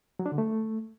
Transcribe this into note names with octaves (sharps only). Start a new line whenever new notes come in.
F#3
D4
D3
A3